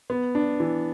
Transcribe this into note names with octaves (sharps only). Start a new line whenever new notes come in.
B3
D4
E3